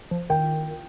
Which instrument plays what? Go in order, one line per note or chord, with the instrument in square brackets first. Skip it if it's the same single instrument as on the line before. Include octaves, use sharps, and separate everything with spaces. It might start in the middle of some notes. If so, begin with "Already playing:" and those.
[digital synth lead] F3
[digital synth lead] D#3 [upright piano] G5